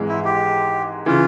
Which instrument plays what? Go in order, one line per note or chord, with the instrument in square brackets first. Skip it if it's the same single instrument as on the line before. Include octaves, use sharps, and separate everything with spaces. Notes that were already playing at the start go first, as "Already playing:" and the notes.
Already playing: [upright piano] G#1 G#2 E3 G#3
[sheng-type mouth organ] E4
G4
[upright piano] C#3 E3 [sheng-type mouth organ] F4